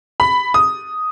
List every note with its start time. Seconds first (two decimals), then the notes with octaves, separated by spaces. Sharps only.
0.20 B5
0.54 D#6